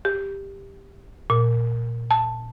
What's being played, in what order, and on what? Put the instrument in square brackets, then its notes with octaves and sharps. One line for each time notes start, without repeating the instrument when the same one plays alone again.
[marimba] G4
A#2
A5